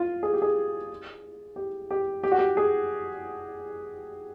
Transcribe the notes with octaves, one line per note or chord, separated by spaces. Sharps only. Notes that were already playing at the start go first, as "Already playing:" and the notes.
Already playing: F4
G#4
G4
G#4
G4
G4
G4
F#4
G4
G#4